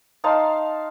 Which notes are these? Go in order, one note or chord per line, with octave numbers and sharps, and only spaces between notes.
D#4 F5 A5 C6